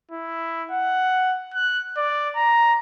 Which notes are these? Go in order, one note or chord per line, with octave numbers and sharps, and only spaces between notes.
E4
F#5
F#6
D5
A#5